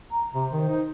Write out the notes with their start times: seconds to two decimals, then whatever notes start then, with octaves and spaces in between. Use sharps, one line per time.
0.11 A#5
0.34 C3 C5
0.52 D#3
0.58 C5
0.69 D#4